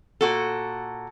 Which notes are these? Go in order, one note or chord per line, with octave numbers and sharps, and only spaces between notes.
A#2 F#4 A4